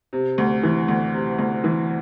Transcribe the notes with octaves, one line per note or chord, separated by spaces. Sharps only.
C3
D2
E3
D2
C3
D2
E3